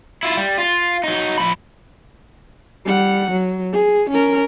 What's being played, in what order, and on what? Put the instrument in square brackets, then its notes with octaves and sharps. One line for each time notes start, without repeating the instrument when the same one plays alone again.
[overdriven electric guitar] E4 F4
G3
F4
F#3 D#4
F3 B5
[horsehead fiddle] G3 F#5
F#3
G#4
C#4 A#4